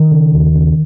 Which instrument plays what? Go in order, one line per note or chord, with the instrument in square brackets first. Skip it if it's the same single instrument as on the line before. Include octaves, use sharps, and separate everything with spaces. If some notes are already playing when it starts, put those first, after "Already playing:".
Already playing: [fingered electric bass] D#3
C#3
D#2
C#3